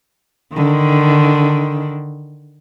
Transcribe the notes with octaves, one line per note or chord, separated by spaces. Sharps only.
D3 D#3